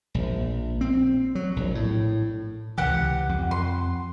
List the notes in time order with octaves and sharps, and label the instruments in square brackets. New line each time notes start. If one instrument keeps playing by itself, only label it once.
[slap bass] A#1
C4
F#3
A#1
A2
[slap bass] C#2 C3 E3 [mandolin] G4 F#5
[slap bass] F2
[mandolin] C6